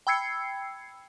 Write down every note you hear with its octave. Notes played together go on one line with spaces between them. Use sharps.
G5 B5 E6 G#6 C7 C#7